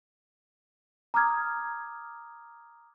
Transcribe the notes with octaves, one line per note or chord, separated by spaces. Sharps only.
A#5 D6 D#6 F6 G#6